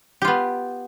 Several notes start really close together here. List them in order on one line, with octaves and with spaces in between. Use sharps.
G4 F4 B3